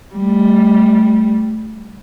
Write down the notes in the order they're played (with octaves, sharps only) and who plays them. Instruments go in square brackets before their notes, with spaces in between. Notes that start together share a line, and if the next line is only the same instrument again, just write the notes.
[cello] G3 A3